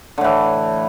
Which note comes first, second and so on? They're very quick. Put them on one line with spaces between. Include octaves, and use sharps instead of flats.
D3 A2 E3